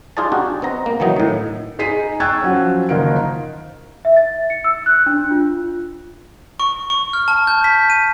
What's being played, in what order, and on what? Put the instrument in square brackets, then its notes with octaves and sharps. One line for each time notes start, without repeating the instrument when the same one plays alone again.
[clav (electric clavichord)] D#4 F4 G#4 D5 A5
D4 F#4 G4
B3 C4 D#5 A#5
A#3
D#3 E3 F#3 D#4
A2 D#3
[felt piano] D#4 G#4 B6 C7 D#7
G5 C#6 E6 F#6 G#6 A6
F3 F#3 C#4
F#1 D#3 D#4 F4 A#4 D7
[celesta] E5
A6
C#7
E6
F#6
D4
F4
[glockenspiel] C#6
C#6
F6
A5
G6
B6
D#7